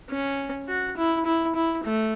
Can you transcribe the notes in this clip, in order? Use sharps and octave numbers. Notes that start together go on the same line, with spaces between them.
C#4
F#4
E4
E4
E4
A3